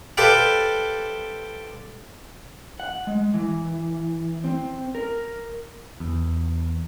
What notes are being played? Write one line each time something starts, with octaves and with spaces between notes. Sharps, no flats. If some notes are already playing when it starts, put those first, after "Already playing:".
G4 A4 B4 C5 D5 F5
F#5
G#3
E3
C4
A#4
E2